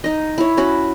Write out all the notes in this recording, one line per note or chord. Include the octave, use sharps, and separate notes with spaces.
D#4 D#5
E4 C#5
C#4 F#4 B5